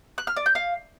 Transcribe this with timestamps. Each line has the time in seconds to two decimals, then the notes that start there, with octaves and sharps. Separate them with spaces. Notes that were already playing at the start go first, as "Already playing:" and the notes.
0.18 F#6
0.27 F6
0.36 D5
0.46 G6
0.55 F5